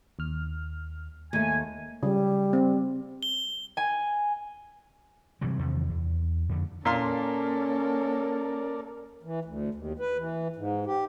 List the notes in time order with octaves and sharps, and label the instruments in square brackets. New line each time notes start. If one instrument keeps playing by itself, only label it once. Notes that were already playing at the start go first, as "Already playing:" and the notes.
[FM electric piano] D#2 F6
[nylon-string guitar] D#2 A3 [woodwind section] G#5
[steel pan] C#3 [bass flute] G3
[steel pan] C4
[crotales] G7
[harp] G#5
[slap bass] C3 E3 F#3 G3
E2 C3 D#3
E2
F2 D3
[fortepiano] A#2 F5 C6 [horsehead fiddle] A#3 A4 [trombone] C#4 [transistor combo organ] A#4 D5
[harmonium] E3
D2
D#2
B4
E3
G#2
G4